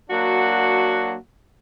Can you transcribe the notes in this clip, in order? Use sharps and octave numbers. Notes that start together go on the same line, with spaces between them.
F#3 A#3 D4 F#4